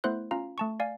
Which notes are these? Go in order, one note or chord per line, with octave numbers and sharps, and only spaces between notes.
A3 B3 E4 C5 C6 F#6
C#4 F4 F5 A#5
A3 A5 C#6
D5 F5 G#5